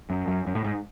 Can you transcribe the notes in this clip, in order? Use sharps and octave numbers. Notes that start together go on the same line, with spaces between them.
F#2
F#2
F#2
A2
G#2